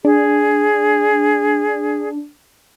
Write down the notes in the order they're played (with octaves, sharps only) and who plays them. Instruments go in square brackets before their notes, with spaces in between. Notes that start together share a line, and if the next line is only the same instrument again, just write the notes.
[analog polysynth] D4 [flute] G#4